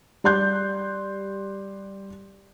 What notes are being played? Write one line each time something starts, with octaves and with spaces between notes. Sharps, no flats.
G3 D5 C6 F#6 G6